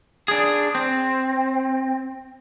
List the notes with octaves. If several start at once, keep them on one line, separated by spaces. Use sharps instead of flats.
D4 G#4
C4